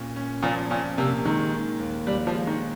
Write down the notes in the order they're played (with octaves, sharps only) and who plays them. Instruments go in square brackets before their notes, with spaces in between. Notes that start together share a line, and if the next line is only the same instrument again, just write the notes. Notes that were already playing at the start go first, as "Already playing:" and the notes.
Already playing: [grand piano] A#2 C#4
C#4
[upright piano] A#2 [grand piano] F3
[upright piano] A#2 [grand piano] C#4
[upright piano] C3 [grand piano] A#3
[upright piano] D#3 [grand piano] G#3
[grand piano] D#3
D#2
[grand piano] D#2 [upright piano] G3
[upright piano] F3
[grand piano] G#3
[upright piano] D#3